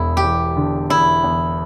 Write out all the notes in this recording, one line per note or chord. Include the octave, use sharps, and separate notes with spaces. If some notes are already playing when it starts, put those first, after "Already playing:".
Already playing: E1 E2 E4
G4
E2
D3
E2 E4
E2